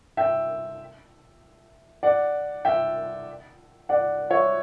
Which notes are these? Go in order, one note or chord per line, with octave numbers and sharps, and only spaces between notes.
E5 G5
D5 F#5
E5 G5
D5 F#5
C#5 E5